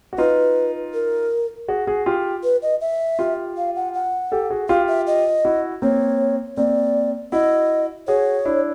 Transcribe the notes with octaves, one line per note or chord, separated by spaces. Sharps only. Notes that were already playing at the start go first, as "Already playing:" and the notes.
F#4
D#4 F4 B4
A#4
F#4 G#4
F#4 G#4
F4 G4
B4
D#5
E5
F4 G4
F5
F#5
F#5
G4 A4
F#4 G#4
F4 G4 F5
E5
D#5
E4 F#4
A#3 C4 C#5
A#3 C4 D5
E4 F#4 D#5
F#4 G#4 C#5
D4 E4